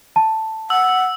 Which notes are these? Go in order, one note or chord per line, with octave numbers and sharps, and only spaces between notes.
A5
F#5 E6